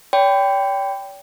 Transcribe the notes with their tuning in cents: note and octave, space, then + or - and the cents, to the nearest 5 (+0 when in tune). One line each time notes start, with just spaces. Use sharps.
C#5 +45 G5 +0 B5 +35